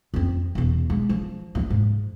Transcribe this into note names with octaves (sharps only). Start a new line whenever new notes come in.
F2 C4
E2 B2
G#3
F3
G2 E4
G#2